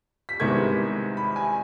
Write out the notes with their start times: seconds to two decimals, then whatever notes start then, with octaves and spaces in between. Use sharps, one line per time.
0.29 B6
0.40 C2 C3 D#3 G#3 B3 G#6
1.17 B5
1.36 G#5